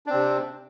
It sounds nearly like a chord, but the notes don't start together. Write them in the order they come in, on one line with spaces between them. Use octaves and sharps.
D4 C4 C3